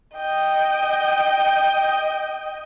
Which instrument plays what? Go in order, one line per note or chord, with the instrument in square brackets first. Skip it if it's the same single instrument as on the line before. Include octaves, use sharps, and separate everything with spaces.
[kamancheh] D#5 G5